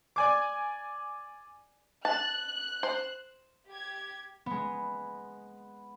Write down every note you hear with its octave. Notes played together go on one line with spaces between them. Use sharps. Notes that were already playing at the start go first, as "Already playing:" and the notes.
D5 G#5 D6
A5 F#6
C5
G4 G#6
G#3 B3